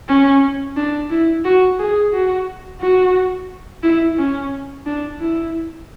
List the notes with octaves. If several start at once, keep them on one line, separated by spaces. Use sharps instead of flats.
C#4
D4
E4
F#4
G#4
F#4
F#4
E4
C#4
D4
E4